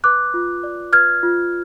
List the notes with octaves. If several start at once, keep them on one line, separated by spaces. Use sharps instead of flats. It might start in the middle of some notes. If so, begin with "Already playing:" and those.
B4 D6 F#6
F4
D5
B4 F6 G#6
F4